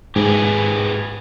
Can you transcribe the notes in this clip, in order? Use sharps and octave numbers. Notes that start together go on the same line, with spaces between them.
G#2 G4 G#4 B4